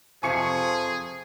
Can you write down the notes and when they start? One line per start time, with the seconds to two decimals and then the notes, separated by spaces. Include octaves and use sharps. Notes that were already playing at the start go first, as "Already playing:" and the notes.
0.23 F2 C3 F3 G#4 G#5 C#6 C#7